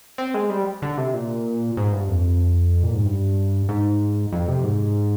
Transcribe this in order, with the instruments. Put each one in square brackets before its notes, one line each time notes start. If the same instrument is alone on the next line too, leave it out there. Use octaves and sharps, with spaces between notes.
[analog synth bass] C4
G#3
G3
D3
C3
A#2
G#2
G2
F2
A#2
G#2
G2
G#2
F2
C3
G#2